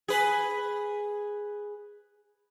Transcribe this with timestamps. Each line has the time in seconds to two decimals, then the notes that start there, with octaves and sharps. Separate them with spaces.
0.08 G#4 B4